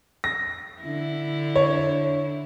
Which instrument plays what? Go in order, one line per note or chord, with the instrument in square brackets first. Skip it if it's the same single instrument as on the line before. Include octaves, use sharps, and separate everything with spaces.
[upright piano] A#6
[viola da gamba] D3 E4
[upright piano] C#5